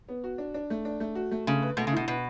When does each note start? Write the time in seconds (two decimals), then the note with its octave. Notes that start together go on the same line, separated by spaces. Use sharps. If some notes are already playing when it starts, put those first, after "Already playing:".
0.08 B3
0.24 F#4
0.38 D4
0.54 D4
0.70 A3
0.85 D4
1.00 A3
1.15 F#4
1.31 A3
1.47 C#3 A3
1.62 B4
1.77 B2 A3
1.87 C#3
1.92 B2 E4
2.08 B2 B4